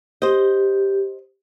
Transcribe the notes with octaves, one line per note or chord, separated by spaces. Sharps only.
G4 C5 D#5